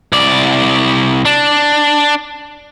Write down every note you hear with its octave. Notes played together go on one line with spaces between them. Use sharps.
C2 D5
D4